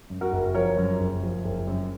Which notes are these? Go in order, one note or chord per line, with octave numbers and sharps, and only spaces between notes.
F#2
F#4 A#4
F#1
F3 A#4 C#5
F#2
F#1
F3
F#1
F#2